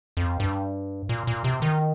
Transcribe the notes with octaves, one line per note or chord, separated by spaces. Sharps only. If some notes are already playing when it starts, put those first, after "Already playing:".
F2
G2
A#2
A#2
C3
D#3